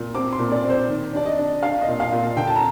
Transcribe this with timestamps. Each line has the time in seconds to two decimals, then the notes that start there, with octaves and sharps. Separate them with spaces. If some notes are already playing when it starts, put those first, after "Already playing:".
Already playing: A#2
0.15 C4 D6
0.33 C6
0.39 A#2
0.52 D5
0.64 C4
0.70 C5
0.89 D#3
1.13 D4 D5
1.26 D#5
1.38 D4
1.63 D4 F5
1.81 D#5
1.87 A#2
2.00 F5
2.12 A#2
2.37 D3 G5
2.47 A5
2.56 A#5